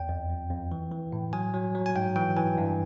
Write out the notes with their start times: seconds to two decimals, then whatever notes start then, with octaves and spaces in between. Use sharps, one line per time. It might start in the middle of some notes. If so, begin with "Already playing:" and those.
Already playing: E2 G5
0.09 F2
0.30 F2
0.50 F2
0.72 E3
0.91 E3
1.12 A2
1.33 F#3 G#5
1.54 F#3
1.75 F#3
1.86 G#5
1.96 G#2 G5
2.16 E3 G5
2.37 E3 G#5
2.58 G2